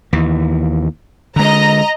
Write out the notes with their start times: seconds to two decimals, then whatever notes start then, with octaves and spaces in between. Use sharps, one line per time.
0.13 D#2 E3
1.36 D3 G#3 D#5 A#5